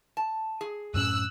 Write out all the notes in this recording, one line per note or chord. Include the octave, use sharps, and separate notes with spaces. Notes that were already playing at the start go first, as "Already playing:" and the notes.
A5
G#4
F#2 A2 C#4 E6 F#6